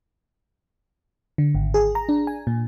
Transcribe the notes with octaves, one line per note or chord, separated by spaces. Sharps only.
D3
G#1
G#4
A#5
D4
G#5
A#2